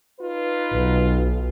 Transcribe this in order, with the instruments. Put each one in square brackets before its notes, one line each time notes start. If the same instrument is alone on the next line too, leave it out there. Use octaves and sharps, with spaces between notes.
[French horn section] D#4 F4 B4
[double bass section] B1